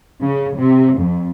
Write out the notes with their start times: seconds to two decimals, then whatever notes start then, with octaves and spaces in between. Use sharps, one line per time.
0.22 C#3
0.57 C3
0.98 F2